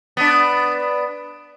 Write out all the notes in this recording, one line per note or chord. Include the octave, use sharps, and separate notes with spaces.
B3 D4